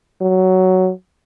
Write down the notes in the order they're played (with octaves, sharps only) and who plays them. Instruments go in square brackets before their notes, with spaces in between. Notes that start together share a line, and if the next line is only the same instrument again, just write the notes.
[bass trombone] F#3